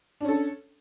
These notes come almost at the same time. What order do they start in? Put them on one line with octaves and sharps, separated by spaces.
D4 C#4 A4